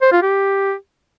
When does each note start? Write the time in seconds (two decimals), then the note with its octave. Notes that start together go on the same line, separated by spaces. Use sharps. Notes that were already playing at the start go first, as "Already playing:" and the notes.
0.02 C5
0.12 F4
0.23 G4